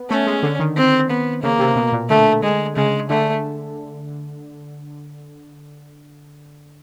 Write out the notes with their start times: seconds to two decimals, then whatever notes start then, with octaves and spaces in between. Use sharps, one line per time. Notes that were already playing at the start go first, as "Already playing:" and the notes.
Already playing: B3
0.10 A3 C#4
0.27 G#3
0.43 D3
0.59 D#3
0.77 C4
1.10 B3
1.43 C#3 A#3
1.59 C3
1.76 B2
1.92 A#2
2.09 D3 A3
2.43 G#3
2.76 C#3 G#3
3.10 D3 A3